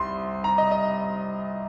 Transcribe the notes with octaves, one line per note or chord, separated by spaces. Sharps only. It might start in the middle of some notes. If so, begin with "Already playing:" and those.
Already playing: C2 C6
A#5
D#5
D#5